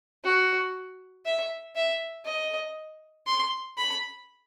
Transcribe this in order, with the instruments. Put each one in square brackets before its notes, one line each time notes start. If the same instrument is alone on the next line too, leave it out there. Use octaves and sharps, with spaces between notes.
[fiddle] F#4
E5
E5
D#5
C6
B5